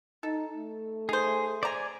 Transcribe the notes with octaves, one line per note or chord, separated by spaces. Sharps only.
D#4 A4
A3
D#4 G#4 C5
C5 D5 G#5 A#5